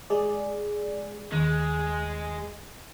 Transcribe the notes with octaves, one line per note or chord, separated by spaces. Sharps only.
G#3 G#4 D5
D#2 G#3